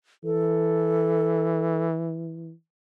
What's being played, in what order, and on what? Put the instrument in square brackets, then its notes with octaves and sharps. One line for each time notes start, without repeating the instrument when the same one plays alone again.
[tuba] E3 [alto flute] A4